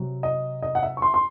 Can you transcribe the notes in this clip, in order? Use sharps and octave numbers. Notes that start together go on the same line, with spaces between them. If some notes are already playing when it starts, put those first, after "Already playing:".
Already playing: C3 F#3
D#5
D#5
F#5
E5
C#6
C6
C6